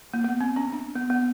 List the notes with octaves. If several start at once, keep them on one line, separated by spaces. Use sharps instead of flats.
A#3
B3
C4
C#4
D4
B3
B3